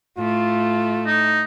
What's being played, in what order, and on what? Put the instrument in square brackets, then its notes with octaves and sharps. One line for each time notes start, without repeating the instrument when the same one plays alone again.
[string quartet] A2 A3 [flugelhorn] F4
[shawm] D#4